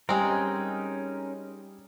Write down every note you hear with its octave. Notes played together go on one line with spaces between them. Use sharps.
G3 G#3 C4 C#4 D#4 A#4